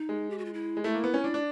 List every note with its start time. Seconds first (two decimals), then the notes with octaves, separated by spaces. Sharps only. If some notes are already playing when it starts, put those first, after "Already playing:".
Already playing: D#4
0.09 G#3
0.30 G4
0.38 F#4
0.45 F4
0.54 E4
0.77 G#3
0.84 A3 E4
0.94 A#3
1.04 B3
1.14 C#4
1.24 D4
1.34 D4